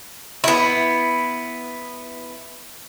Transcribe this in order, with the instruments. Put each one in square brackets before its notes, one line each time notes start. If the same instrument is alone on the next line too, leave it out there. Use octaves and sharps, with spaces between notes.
[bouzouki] B3 E4